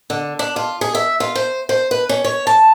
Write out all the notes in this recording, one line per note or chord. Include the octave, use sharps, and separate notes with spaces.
D3
D4
F4
G#4
E5
F4
C5
C5
B4
C#4
C#5
A5